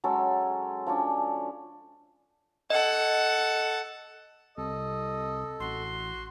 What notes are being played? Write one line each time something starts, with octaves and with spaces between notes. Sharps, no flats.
F#3 G#3 C#4 A4
F3 C#4 D4
A4 D#5 F#5
C2 A4 D#5
A1 F#4 C6